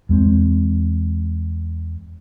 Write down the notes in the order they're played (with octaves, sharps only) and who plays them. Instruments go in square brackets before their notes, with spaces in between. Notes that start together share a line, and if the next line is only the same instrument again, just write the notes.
[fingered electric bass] E2 G#3 C4